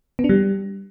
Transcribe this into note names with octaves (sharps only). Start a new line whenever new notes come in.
B3
D4
G3